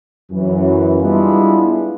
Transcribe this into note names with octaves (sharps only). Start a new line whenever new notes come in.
F#2 E3
G3 G#3 B3 D4 E4 F4